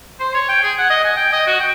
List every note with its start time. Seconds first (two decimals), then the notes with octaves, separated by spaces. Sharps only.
0.20 C5
0.34 C#5
0.49 G5
0.63 G#4
0.78 F#5
0.90 D#5
1.04 G#5
1.16 G5
1.33 D#5
1.47 F#4
1.60 G5